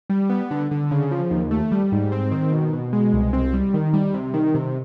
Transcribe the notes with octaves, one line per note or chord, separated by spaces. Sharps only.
G3
B3
D3
D3
C#3
F3
D#2
A3
G3
G#2
C4
D#3
B2
B2
G#3
C2
C4
G3
D#3
G3
C3
D#3
C3